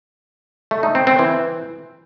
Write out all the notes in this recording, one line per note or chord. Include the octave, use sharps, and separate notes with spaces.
A3
D#4
C4
C4
E3